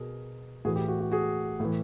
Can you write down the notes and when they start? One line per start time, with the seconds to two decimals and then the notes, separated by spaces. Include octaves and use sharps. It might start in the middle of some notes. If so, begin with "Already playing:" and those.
Already playing: B2 G#4 A#4
0.65 A2 E3 F#4 G#4
0.76 G4
0.88 F#4
1.00 F#4
1.12 F#4 G#4
1.60 A2 E3